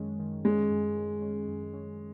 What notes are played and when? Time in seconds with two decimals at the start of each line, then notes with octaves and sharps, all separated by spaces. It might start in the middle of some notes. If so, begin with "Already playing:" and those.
Already playing: F#2 D#3 G#3 C#4
0.19 D#3
0.45 G#3 C#4
0.70 F#2
0.96 D#3
1.22 C#4
1.47 F#2
1.73 C#4